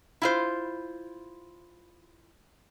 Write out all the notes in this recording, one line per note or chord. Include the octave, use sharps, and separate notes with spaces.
E4 F4 C5